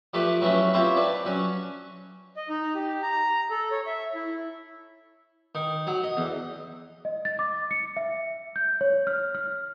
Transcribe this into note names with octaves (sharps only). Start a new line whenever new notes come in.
F3 A3 G4 B4 D5
F#3 A3 B3 C#4 E4
C4 E4 F4 G4 C5 C#5
D4 B4 D5
F#3 C#4
D#5
D#4
G4
A#5
A4
C#5
E5
E4
D#3
F#3
D#5
E2
D#5
A6
D6
C#7
E5
G6
C#5
F6
F6